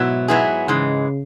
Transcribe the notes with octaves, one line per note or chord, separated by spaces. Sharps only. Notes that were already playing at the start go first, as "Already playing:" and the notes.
Already playing: G#2 B2 F#3 B3 E4
G#2 F#3 B3 E4 G#4
G#2 C#3 E3 G#3